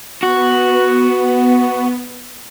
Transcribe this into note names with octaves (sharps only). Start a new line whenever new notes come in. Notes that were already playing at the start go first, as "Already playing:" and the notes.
B3 F#4